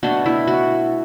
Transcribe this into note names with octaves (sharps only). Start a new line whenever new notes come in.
B2 A3 D4 F#4
E4
F#4